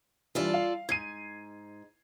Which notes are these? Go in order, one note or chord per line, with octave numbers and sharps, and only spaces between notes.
E3 G3 D4 F4 A4 D5
F5
G#2 G#6 C7 D#7